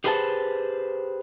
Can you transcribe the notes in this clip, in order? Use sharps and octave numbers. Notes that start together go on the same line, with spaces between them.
G4 G#4 B4 C5 F5 A5